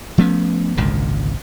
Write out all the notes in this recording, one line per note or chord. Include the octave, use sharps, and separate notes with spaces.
F3 A3 B3 C#4
G#1 C#2 A#2 D3